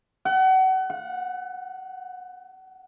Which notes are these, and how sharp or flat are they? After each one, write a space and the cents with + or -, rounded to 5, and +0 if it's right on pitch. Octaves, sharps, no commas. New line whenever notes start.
F#5 +30
F#5 -25